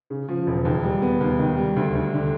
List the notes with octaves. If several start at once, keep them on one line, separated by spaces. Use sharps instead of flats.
C#3
F3
E1
D#2
G3
B3
D#2
D#3
G3
D2
D2
D3